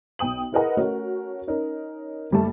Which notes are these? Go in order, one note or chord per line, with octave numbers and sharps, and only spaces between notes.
B1 G5 D#6 F#7
E4 G#4 A#4 B4 D#5 F#5
A3 C#4 F#4 A#4
C#4 D#4 A#4
F#1 G3 A3 A5